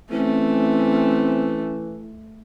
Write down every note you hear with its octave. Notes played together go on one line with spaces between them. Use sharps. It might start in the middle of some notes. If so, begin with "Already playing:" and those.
E3 A3 C4 C#4